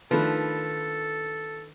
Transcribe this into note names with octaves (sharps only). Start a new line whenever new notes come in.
D#3 F3 A3 D4 A4 B4